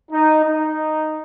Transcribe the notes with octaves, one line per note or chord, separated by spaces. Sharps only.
D#4
D#4